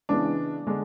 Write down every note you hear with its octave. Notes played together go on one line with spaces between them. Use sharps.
C#3 E3 G#3 B3 D4
D3 G#3 D4